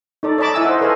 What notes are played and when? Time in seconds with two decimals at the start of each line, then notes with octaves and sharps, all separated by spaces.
0.23 D#4 A4 D5
0.38 C#5 D#5 A5 B5 D6
0.54 E4 E5 G#5 E6
0.65 C5 D#5 F#5
0.81 A4 B4 C#5 D#5 F5 G#5